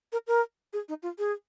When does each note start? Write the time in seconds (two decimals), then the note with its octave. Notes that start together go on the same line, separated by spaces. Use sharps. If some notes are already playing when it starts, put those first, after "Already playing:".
0.12 A#4
0.27 A#4
0.73 G#4
0.89 D#4
1.03 F4
1.19 G#4